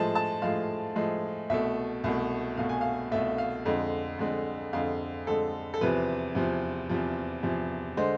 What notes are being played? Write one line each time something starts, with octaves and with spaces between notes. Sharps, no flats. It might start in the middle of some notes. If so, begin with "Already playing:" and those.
Already playing: A2 F3 G#3 A5
A5
A2 F3 G#3 F5
A2 F3 G#3
C2 B2 A3 E5
C2 B2 A3
C2 B2 A3 F5
G#5
F5
C2 B2 A3 E5
F5
F2 D3 G#3
F2 D3 G#3
F2 D3 G#3 F5
F2 D3 G#3 A4
A4
E2 C3 F3 B4
E2 C3 F3
E2 C3 F3
E2 C3 F3
D3 G#3 C5